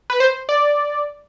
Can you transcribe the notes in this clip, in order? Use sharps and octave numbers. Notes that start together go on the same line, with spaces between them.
B4
C5
D5